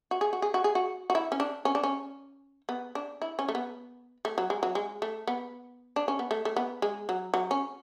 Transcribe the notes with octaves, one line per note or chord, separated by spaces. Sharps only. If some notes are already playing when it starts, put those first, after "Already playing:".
F#4
G#4
F#4
G#4
F#4
G#4
F#4
F#4
E4
C#4
D4
C#4
D4
C#4
B3
D4
E4
C#4
A3
B3
A3
F#3
G#3
F#3
G#3
A3
B3
D4
C#4
B3
A3
A3
B3
G#3
F#3
F#3
C#4